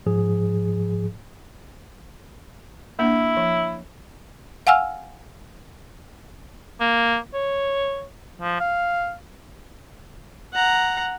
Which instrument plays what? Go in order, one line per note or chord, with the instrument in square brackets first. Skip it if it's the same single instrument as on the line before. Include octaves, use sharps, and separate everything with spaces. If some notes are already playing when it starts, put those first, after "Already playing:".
[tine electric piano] G#2 F3 G#4
[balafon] A#3 D4 [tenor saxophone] E4
[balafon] F3
[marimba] F5 F#5 G#5 E6 F6
[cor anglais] A#3
C#5
F3
F5
[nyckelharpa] F#5 A#5